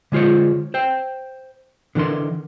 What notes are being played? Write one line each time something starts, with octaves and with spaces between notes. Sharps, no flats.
D3 G#3 F4 C5 C#5
C5 G5
D3 E3 D4 A#4 C6